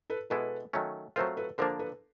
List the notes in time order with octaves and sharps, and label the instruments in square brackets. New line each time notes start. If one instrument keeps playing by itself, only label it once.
[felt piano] A4 B4
[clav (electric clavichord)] B2 G#3 B3 E4 [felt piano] A4 B4
[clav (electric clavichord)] D#3 F#3 A3 C#4
[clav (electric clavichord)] F#3 A3 C4 F4 [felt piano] A#4 C5
[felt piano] A4 B4
[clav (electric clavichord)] D3 F3 A#3 D4 [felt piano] A#4 C5
[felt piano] A4 B4